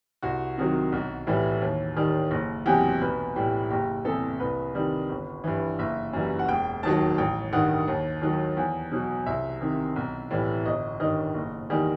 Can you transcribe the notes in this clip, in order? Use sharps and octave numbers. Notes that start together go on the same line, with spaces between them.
C2 F#4
C3 D#3 F#3
B1
A2 E3 G3
D#2
D#3 G3
F#1
E2 C3 F#3 G4
B1 B4
A2 G3 G4
F#1 G4
E2 C3 A4
C2 B4
C3 D#3 G3
G1
G2 E3
F#1 E5
F#2 E3 G3
F#5
E1 G5
D#2 D#3 F#3 A5
A1 G5
G2 D#3 F#5
D#2
D#3 F#3
E2
B2 F#3
C2 E5
C3 D#3
B1
A2 E3 G3
G1 D#5
G2 D#3 D#5
F#1
E2 D#3 G3